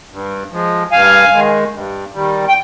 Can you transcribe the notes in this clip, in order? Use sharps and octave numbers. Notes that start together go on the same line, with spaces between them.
G2
F3 G#3
G2 F5 G#5
D#3 G#3
G2
D#3 G3
G5